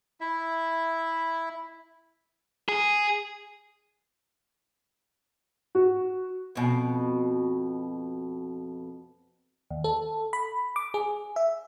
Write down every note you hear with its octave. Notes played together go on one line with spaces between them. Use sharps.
E4 E5
G#4
F#4
F2 B2
D#2
A4
B5
D6
G#4
E5